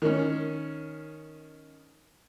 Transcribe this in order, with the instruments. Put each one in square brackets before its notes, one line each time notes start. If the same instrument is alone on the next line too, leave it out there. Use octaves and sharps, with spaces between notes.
[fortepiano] D#3 C#4